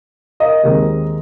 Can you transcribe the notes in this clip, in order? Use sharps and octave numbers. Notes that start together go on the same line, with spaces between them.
A#4 D#5
D#2 D#3 G#3 C4